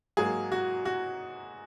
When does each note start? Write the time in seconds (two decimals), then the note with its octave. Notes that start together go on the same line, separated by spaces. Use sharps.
0.17 G#2 F#3 A#3 G#4
0.52 F#4
0.85 F#4